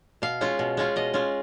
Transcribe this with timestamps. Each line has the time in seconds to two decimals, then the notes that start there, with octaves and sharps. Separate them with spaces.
0.22 B2 F5
0.41 G#3 C#4 F4
0.59 B2
0.77 G#3 C#4 F4
0.96 B2 D#5
1.14 G#3 C#4 F4